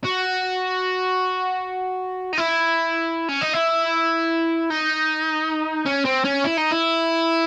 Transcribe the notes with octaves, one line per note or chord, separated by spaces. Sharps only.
F#4
D#4
E4
C#4
D#4
E4
D#4
C#4
C4
C#4
E4
D#4
E4